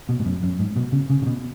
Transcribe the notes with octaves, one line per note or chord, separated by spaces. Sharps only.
B2
G#2
F#2
F#2
G#2
B2
C#3
C#3
C#3
B2